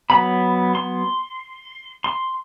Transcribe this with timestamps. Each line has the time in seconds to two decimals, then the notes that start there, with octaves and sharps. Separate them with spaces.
0.10 F#3 B3 B5
0.75 C6
2.04 C6